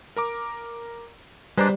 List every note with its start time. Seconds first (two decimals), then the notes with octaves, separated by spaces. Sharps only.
0.16 A#4 A#5 D6
1.58 G3 G#3 D4 B4 C5 A#5